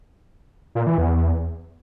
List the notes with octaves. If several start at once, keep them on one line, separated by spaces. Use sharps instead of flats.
A#2
E3
E2